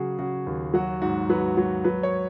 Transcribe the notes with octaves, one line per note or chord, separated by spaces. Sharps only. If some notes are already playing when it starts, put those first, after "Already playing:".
Already playing: C#3 F#3 F#4 G#4
C#3 F#4
D#2
F#3 F#4
G#2 F#4
F#3 B4
F#3
F#3 B4
C#5